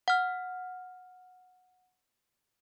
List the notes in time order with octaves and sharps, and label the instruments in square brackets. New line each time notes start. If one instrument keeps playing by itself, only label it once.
[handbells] F#5 F6